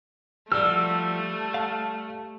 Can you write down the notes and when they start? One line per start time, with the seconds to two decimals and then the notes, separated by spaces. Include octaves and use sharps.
0.52 F3 G3 A3 F#4 E6 F6
1.54 F5 A5 F6